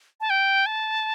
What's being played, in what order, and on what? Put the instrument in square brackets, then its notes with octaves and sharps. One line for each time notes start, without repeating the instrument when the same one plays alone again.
[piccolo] A5
G5
A5